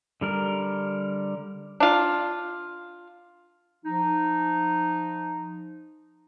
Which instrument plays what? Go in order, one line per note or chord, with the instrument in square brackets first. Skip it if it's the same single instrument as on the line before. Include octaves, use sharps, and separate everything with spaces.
[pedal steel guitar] D3 G3 A#4
[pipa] D4 F4
[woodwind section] F3 D#4